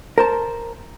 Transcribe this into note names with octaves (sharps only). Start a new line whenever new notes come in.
A#4 C5 A5